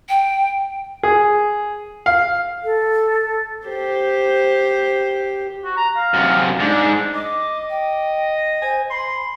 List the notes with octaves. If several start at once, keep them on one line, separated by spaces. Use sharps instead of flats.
G5
G#4
F5
A4
G4 C5
F#4
A#5
F5
F#2 C3
G#2 D4
D#5 D6
G5
C5 G#5
B5 C6